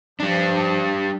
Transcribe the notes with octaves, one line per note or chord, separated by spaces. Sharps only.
F3 G3 D4